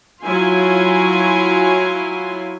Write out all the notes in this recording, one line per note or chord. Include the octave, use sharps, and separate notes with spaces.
F#3 E4 F4 G#5 C6